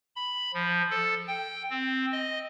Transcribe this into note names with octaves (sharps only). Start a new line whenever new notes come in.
B5
F3
A4
G5
C4
D#5